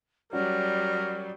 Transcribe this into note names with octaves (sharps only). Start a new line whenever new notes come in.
F#3 G3 C#4 F#4 A#4 D5